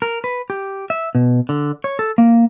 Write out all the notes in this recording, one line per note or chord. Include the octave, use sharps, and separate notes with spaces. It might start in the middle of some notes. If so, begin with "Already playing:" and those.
A#4
B4
G4
E5
B2
D3
C#5
A4
A#3